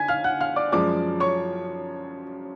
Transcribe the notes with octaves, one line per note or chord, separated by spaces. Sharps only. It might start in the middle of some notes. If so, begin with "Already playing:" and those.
Already playing: D3 G#5 G#6 B6
F5 F6
F#5 F#6
F5 F6
D5 D6
F#2 F3 G#3 D5 D6
C#5 C#6